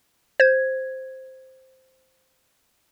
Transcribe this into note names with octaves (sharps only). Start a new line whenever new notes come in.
C5 G#6